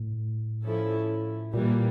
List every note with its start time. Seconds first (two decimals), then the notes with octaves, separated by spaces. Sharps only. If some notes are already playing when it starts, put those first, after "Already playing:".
Already playing: A2
0.64 F3 C#4 E4 A4
1.54 A#2 E3 G3 A#3